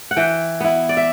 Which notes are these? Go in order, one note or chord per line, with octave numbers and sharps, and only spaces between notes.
F#5
E3 G5
B3 E4
D5
E5